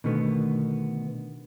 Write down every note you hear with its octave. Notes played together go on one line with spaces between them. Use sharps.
B2 D3 D#3 A3 B3